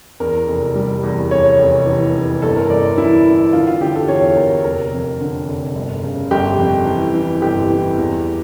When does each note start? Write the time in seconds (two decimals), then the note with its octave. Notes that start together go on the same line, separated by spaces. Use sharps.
0.20 E2 A#4
0.48 F1
0.75 G3
1.03 E2
1.31 F1 C#5
1.59 F1
1.86 E3
2.14 E3
2.42 G1 A4
2.56 A#4
2.70 G1 D5
2.98 E3 E4
3.25 E3
3.53 D3 F4
3.67 F4
3.81 D3 G4
3.95 A4
4.08 E2 C#5
4.37 E2 A#4
4.64 F1 A#4
4.92 F2
5.20 D3
5.47 F1
5.75 G1
6.03 C#3
6.31 G1 G4
6.59 F2
6.86 E3
7.14 E3
7.42 G1 G4
7.70 E3
7.97 E2